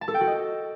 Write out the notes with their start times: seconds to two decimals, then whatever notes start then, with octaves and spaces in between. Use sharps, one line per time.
0.01 A5
0.08 A4
0.14 G5
0.21 F#4
0.27 D#5